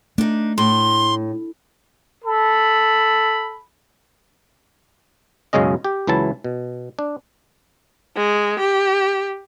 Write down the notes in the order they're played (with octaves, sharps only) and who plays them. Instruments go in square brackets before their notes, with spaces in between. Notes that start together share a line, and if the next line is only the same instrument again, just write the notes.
[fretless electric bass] A3 [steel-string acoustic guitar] D4 D#4
[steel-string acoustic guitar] A2 [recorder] C6
[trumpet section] A4 B5
[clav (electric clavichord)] B1 F#2 C#3 G#3 C#4 D#5
G4
C#2 E3 F#3 E4 A5
B2
D4
[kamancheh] G#3
G4